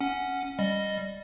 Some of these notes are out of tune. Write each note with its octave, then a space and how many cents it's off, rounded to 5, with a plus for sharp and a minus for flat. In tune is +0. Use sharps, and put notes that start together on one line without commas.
C#4 +0 F#5 +0
G3 +0 D#5 -5